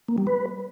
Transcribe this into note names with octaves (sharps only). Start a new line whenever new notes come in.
A#3
G3
B4